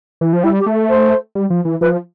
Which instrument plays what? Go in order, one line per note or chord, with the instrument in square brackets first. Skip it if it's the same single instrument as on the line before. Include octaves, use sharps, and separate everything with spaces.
[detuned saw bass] E3
F3
[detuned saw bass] G3 [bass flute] E4
[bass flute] G4
[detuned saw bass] A3
[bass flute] C5
[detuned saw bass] G3
F3
E3
[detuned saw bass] F3 [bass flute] B4